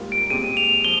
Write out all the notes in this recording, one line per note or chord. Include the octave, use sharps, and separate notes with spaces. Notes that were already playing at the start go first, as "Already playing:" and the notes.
Already playing: G#2 G3 A#3 F4
D7
A#2 G#3 C4 G4 D#7
F7
F3 G7